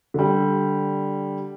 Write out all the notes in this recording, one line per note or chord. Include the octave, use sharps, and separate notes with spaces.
D3 G3